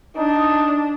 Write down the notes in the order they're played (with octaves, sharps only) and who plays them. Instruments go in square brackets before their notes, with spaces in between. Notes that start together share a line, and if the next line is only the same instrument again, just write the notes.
[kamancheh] D4 [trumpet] D#4